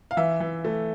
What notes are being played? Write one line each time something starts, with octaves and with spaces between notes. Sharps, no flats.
F5
E3 E5
E3
A3